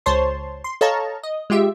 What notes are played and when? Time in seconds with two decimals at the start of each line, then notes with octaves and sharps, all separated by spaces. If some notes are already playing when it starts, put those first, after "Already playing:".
0.06 C#2 C5 C#5 A5 C6
0.64 C6
0.81 A4 C#5 D#5 F5 A5 A#5
1.23 D#5
1.50 G#3 F4 G4 E5